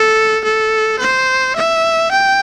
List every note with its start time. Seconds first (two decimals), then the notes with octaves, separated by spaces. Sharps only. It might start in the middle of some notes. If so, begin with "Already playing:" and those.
Already playing: A4
0.44 A4
0.99 C5
1.56 E5
2.11 G5